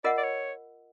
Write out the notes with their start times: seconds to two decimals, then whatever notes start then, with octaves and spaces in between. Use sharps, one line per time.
0.04 F4 A#4 D5 D#5 F#5
0.18 D5
0.23 C#5